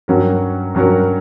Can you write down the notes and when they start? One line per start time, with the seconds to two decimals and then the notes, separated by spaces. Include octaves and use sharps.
0.08 G2 F#3 C#4 F#4 A#4
0.75 G2 F#3 C#4 F#4 A#4